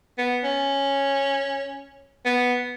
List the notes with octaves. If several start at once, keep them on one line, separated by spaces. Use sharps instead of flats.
B3
C#4
B3